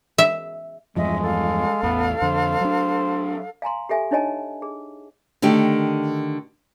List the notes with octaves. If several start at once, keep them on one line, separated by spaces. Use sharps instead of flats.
E5
E2 G2 F3 G#3 D#5 E5
A4 F5
A1 E2 B3
F2 D3 C5
F#3 D4
F5 G#5 A#5 C6
G4 A4 E5 G#5
D4 D#4 C#5 D#5 G#5 A5
G#4
D3 D#3 A3 G4